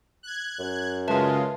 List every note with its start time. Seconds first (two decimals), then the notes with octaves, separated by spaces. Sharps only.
0.23 F#6 G#6
0.59 F#2
1.08 C#3 G#3 F4 B4 E5 A5